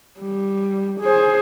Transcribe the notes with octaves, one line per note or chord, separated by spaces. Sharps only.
G3
G#4 C5